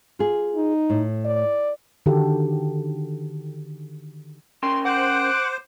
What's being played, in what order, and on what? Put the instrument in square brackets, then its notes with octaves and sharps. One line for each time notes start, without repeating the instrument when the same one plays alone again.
[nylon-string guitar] F4 G#4
[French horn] D#4
[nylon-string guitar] A2
[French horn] D5
[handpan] D3 D#3 F#4 G4 A4
[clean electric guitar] C#4 A#4 G5 [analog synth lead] C6
[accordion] C5 [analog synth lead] F#5 [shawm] D6